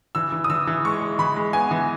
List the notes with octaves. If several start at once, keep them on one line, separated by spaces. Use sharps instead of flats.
E3 E6
E3
D#6
E3 E6
E3
G#3 C#6
G#3
E3 B5
G#3
B3 G#5
E3